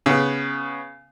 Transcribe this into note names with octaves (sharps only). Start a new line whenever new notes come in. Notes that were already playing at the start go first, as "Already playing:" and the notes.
C#3 B3